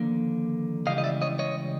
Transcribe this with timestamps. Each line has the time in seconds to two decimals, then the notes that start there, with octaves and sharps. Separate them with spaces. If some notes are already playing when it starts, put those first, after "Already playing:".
Already playing: D#2 D3 F3 A#3
0.86 C#2 C#3 E3 G3 D#5 F5
0.98 D#5
1.04 D5 E5
1.22 C#5 D#5
1.39 C#5 D#5